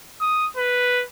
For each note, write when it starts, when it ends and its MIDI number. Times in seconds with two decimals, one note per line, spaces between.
0.21 0.47 87
0.57 1.04 71